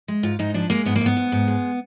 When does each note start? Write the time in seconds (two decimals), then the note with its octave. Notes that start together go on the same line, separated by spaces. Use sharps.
0.08 G#3
0.23 G#2 F4
0.39 G#2 D#4
0.54 F3 D4
0.70 G#3 A#3
0.85 G#2 B3
0.96 A#3
1.01 G#2
1.06 B3
1.17 G#2
1.32 G#2
1.47 G#3